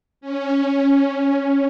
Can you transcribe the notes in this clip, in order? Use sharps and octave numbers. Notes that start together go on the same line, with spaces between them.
C#4
C#4
C#4